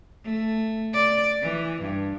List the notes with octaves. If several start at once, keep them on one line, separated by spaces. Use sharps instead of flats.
A3
D5
E3
G2